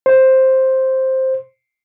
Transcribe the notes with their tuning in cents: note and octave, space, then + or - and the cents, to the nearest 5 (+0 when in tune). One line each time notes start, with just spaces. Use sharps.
C5 +5